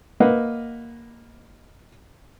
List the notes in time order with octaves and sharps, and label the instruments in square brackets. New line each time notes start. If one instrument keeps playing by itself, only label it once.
[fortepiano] A#3 B4 D#5 F#5